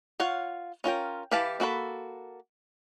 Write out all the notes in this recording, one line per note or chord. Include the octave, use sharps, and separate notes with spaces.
F4 C#5 F5 F#5
C#4 F4 A#4 G5
E3 G4 B4 F5 A5
A#3 F#4 A4 B5